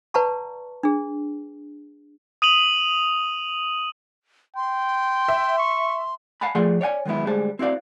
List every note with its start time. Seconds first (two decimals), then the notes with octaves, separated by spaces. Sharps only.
0.14 B4 D5 F#5 A5 A#5 C#6
0.83 D4 G#4
2.42 D#6 D#7 F7 F#7
4.56 G5 C6
5.28 E5
5.58 C#6
6.41 F5 F#5 G#5 A5 B5
6.55 F3 A3 G#4 D5 F#5 C6
6.81 C#5 D5 F#5 G#5
7.05 D#3 F#3 G#3 B3 E4
7.27 D2 G3 G#3 G#4 C5 A5
7.59 C4 E4 F#4 D5 F5